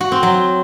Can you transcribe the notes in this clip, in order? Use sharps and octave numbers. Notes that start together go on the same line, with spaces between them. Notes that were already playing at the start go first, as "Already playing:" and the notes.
F#4
C4
F#3